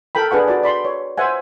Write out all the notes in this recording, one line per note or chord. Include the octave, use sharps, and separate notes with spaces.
A4 A#4 G5 B5
D4 G#4 B4 F#5 C#6
F#4 D5
D5 B5 C6
C#5
C5 E5 F#5 G#5